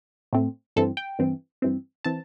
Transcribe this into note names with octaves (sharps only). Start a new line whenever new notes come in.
A2 A3 C4
G2 E3 C4 A4
G5
G2 E3 C4
G2 E3 C4
E3 C4 A5